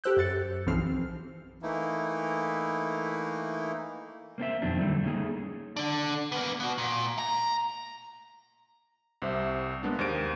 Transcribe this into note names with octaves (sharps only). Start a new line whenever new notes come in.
G4 A4 C5 E6 F#6 G6
F#2 G6 A6 C#7
B1 E3 F3 C4 F6 C7
E3 A3 A#3 D#4 E4
A#3 C4 D4 E5
F2 B2 D#3 F#3 C4 D4
D3 G3 A3 A#3 E4
A3 A#3 C#4 D#4 G4 G#4
D3 D4
A#3 B3
B3 F#4
A#2
A#5
C2 C3 C5 E5
G#3 A#3 B3 D4
D#2 A#3 C5 G6 D7